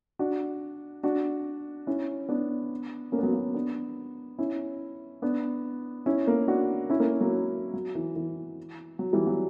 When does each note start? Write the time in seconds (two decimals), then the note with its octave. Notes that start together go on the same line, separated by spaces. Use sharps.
0.19 D4 F#4
1.03 D4 F#4
1.87 C#4 E4
2.29 B3 D4
3.12 A#3 C#4
3.19 B3
3.23 F#3 A#3
3.33 F#3
3.54 B3 D4
4.38 C#4 E4
5.22 B3 D4
6.06 C#4 E4
6.27 A#3 C#4
6.48 D4 F#4
6.90 C#4 E4
7.00 A#3 C#4
7.21 F#3 A#3
7.74 F#3
7.95 E3
8.16 E3
8.99 F#3
9.13 E3 G3
9.27 F#3